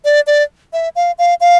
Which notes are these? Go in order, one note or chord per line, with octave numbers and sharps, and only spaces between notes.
D5
D5
E5
F5
F5
F5